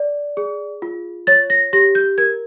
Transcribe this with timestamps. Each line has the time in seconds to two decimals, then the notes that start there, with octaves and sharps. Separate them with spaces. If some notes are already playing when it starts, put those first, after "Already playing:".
Already playing: D5
0.37 G#4
0.82 F4
1.27 C#5 A6
1.50 A#6
1.73 G4 A#6
1.95 G6
2.18 A#4 G#6